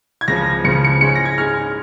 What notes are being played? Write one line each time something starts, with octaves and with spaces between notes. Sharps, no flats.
G#6
C#2 C#3 F3 A#6
C#2 C#3 F3 C#7
C#7
G#2 G#3 C#4 C#7
A#6
G#6
G#2 G#3 C#4 F6